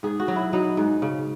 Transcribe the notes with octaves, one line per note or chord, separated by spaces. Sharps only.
G#2 G#4
F#4
F#3
E4
F#3 D#4
G#2
C#3